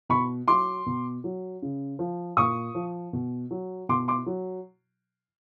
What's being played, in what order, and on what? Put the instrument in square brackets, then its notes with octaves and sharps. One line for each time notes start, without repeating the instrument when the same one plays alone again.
[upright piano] B2 B5 C#6
F#3 C6 D6
B2
F#3
C#3
F3
A#2 C#6 D#6
F3
B2
F#3
B2 C6 D6
C6 D6
F#3